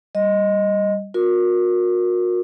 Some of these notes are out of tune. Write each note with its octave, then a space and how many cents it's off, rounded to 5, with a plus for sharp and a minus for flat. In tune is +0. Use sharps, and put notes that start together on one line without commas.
G3 +0 D#5 +0
F#4 -40 A#4 +5